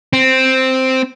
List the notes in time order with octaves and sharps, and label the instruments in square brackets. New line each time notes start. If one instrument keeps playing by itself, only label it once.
[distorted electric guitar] C4